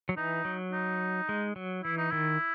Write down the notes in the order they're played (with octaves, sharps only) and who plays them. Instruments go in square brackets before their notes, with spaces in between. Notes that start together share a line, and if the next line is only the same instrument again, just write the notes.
[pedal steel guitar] F#3
[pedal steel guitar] E3 [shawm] D#4
[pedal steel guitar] F#3
[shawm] D#4
[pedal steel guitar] G#3
F#3
[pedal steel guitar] E3 [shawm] E4
[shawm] D#4
[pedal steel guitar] D#3 [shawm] E4